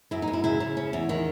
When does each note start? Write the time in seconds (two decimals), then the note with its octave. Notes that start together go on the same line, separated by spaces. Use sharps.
0.11 F#2 E4
0.22 D#4
0.27 F#2
0.33 E4
0.44 C#3 E4
0.60 C#3
0.77 C#4
0.93 E2
1.09 D#3 E4